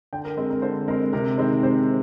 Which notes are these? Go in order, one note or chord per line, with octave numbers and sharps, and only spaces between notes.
D3 G5
A#4
G#3 C4
A#4
D3 C5
G#3 C4 A#4
C3 A#4
D#3 G#3 C4 C5
C3 C5